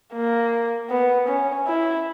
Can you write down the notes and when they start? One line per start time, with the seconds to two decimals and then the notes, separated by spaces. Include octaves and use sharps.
0.13 A#3
0.90 B3
1.28 C#4
1.67 E4